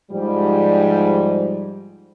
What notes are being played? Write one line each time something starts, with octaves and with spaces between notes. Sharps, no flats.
G#2 F3 G3